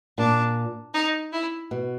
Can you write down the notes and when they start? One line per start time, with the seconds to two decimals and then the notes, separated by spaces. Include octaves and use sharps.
0.18 A#2 D4
0.94 D#4
1.33 E4
1.71 B2